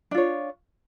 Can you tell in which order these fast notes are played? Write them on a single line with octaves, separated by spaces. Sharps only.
D4 F4 C#5